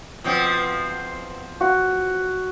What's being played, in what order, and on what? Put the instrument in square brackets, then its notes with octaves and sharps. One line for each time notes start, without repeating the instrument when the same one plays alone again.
[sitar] B2 F3 C4
[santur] F#4